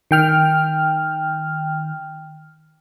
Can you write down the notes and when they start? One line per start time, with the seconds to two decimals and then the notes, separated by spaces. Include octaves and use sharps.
0.11 D#3 G5 F6